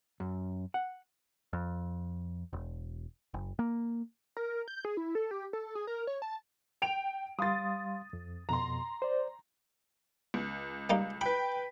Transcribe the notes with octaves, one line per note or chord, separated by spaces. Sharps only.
F#2
F#5
F2
E1
F#1
A#3
A#4
G6
G#4
E4
A4
G4
A4
G#4
A#4
C#5
A5
G5 D7 F7
G3 F5 C6 D#6 A6
F2
F2 B2 A#5 C6
C5 D5
C#2
G3 A#3 D#4
B4 G5 B5